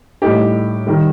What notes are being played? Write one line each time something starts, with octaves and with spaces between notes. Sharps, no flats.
A2 G3 D#4 G4
D#3 G3